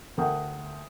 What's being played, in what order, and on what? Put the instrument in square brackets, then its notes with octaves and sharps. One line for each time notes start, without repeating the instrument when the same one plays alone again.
[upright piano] D2 A4 A#4 F#5 G5 D#6